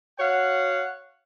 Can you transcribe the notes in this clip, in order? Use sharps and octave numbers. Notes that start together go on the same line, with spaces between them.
F#4 C#5 F5 F#5